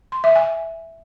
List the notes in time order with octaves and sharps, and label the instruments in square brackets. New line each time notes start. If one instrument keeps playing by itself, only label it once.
[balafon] C6
E5
G#5